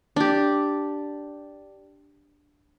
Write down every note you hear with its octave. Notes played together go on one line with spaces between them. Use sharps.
D4 G4